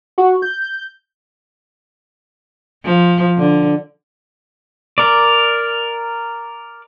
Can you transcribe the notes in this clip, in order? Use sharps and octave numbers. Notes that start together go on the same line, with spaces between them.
F#4
G6
F3
D3
A#4 D5